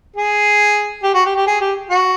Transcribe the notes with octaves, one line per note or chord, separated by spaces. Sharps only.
G#4
G4
F#4
G4
G4
G#4
G4
F#4